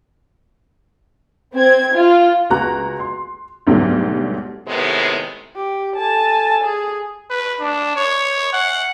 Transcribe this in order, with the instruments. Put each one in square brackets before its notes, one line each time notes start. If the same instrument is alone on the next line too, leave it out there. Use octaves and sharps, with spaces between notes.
[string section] C4 G#6
F4
[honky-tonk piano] C#2 F#4 A#5 F#6
C6
D2 G#2 B2 F#3 G3
[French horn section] A2 C3 D#3 G#3 B3
[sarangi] G4
[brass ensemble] A4 G#5 [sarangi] A5
[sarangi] G#4
[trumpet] B4
D4
C#5
F#5